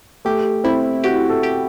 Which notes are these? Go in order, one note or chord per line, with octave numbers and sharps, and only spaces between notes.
A3 G4
C4 E4
F#4 G4
A4
G4